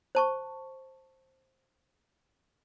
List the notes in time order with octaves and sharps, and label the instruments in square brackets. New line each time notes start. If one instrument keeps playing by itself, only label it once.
[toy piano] C5 A5 C#6